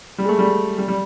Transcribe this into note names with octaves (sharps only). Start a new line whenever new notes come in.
G3
G#3
A3
G3
G3
G3